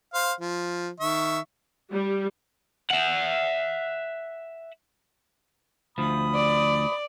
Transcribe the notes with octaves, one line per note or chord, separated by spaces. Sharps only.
C5 F5
F3
D#3 E5 C#6
G3
E5 F#5
D2 F3 B5 D#6
D5